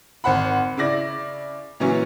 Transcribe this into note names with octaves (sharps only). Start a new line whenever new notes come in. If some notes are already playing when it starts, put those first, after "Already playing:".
G#1 C5 F#5 B5
C#3 E4 D5 A#6
A#2 E3 F#3 C#4